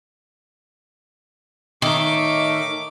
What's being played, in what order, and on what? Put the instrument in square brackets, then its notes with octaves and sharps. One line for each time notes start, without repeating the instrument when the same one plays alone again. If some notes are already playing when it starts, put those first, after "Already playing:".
[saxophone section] A2 C#5 E5 [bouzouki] D#3 [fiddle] D#4 D6